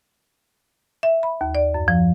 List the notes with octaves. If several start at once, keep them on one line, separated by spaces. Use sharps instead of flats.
E5
B5
D#2
D5
F#2
F3